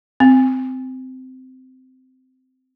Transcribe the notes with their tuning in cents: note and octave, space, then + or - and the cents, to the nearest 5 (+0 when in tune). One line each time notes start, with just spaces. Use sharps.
C4 -15